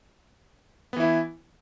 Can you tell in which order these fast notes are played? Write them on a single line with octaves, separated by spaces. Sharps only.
B3 E3 E4